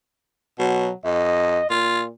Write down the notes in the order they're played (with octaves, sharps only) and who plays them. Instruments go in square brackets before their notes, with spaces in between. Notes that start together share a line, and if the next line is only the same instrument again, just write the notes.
[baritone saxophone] B2 [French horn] F#3
[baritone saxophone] F2 [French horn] D#5
[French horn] A#2 [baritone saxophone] F4